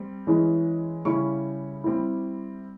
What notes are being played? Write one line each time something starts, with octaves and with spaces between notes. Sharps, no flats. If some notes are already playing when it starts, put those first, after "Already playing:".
Already playing: G3 C4
E3 G#3 C#4 E4
C#3 G3 C#4 E4 C#6
G3 C4 E4